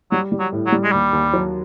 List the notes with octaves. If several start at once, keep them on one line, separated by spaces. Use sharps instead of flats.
F#3 G3
G3
F#3
A2
F#3
G3
G#3
D#2 G3
D#2
F#3